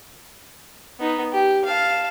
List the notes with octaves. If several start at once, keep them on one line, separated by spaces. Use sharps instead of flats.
B3 D#4
G4
F5 A5